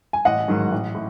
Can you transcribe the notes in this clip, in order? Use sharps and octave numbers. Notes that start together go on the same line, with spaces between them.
G#5
A1 D#5 F#5
G#2 D#3 F#3
A1
A2